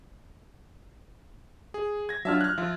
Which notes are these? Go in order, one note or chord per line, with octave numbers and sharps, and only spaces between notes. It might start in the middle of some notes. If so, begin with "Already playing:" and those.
G#4
G#6 A#6
F#3 D4 F4 E5 A5 F6
F6 F#6
F3 F4 E5